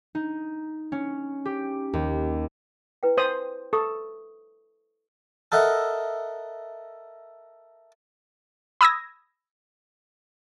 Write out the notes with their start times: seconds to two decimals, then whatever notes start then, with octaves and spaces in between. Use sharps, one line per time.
0.15 D#4
0.92 C#4
1.45 G4
1.93 D#2
3.03 E4 B4 G5
3.17 C5 A5 D#6
3.73 A4 C#6 D#6
5.52 A4 A#4 D#5 E5 F#5
8.81 B5 D#6 E6 G#6 A#6